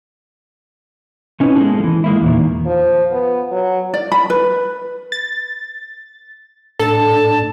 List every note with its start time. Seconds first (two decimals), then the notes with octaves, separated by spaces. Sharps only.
1.40 A3 C#4 D#4 E4 B4 C#5
1.56 G#3 A#3 B3 C#4 G#4 A4
1.80 E3 F3
2.04 G#3 A#3 E4
2.22 E2 A#2 D#3
2.65 F3
3.11 B3
3.51 F#3
3.94 D5
4.12 B5
4.30 B4
5.12 A6
6.79 A2 D4 A4 A5